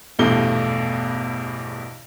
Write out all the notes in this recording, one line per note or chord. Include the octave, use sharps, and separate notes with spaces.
A#1 E2 G2 B2 A3 G7